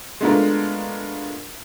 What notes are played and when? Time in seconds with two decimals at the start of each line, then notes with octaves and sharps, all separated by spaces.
0.21 G#3 A3 B3 D4 F4 A#4